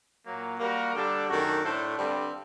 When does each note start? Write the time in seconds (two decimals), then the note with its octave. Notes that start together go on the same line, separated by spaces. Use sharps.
0.24 A#2 F#3 A#3
0.58 G3 A#3 F#4 A#4
0.93 D3 G3 D4 A4
1.27 F#2 D#3 A3 D4 F#4
1.62 A2 A3 D4 A4 C5
1.97 G2 D3 G3 C4